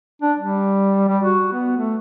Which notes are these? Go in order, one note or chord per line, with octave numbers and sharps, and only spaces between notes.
D4
G3
G3
F#4
B3
A3